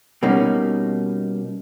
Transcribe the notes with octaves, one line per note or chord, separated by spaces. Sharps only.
B2 G3 A#3 C#4 D#4